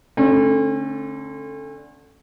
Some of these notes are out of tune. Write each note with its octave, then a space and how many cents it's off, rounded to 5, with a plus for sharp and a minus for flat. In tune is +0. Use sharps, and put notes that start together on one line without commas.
D3 +0 A3 +5 C#4 -40